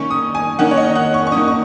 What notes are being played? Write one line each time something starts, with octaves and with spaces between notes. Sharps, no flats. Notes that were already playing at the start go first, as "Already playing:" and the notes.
Already playing: D#3 A#3 C#4 C#6
D#6
G#5
D#3 A#3 C#4 F#5
C#5
D#5
F#5
C#6
C#6
D#3 A#3 C#4 D#6
C#6